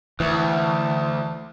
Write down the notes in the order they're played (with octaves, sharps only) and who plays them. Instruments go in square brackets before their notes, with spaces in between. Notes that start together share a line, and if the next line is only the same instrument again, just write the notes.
[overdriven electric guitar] D2 [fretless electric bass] E3